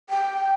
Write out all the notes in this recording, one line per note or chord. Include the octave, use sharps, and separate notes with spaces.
G5